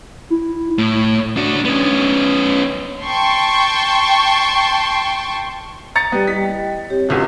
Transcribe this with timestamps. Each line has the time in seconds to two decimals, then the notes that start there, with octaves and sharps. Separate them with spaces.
0.30 E4
0.78 A2
1.37 D4 F#4
1.65 B3 C#4
3.03 G5 A5 C6 C#6
5.95 A#5 A6 C#7
6.12 G3 B3 G4 D5
6.27 E4 D#5 G5 B6
6.90 C4 G4 C#5
7.09 G#1 C#2 F3 F#4